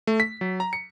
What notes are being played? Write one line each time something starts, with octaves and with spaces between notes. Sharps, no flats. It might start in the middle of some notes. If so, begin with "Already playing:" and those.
A3
B6
F#3
A#5
C#7